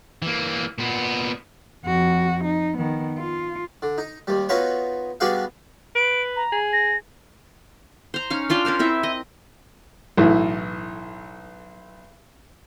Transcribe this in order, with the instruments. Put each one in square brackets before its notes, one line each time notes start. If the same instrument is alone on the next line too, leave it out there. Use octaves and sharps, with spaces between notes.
[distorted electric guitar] E3 A#3
A#2 B3
[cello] F2 F#4
D#4
D#3 B3
F4
[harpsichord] D3
D#4
D#2 G3
B3 D#4 F4 F#4 B4 C#5
G3 B3 D4 F#4 G#4 F5
[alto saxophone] B4 [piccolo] D7
[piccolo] A#5
[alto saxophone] G#4
[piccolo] A#6
[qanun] C5 A#5
C#4 D#4 F5
D4 F4 F5 G5
C#4 A#4 C5 F5
C4 E4 E5
D#5
[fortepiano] B1 A2 E3 E4